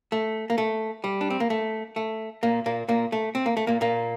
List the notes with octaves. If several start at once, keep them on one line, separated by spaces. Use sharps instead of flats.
A3
A#3
A3
G3
D4
C4
A#3
A3
A3
A#2 A#3
A#2 A#3
A#2 A#3
A3
C4
A#3
A3
A#2 A#3
A#2 A#3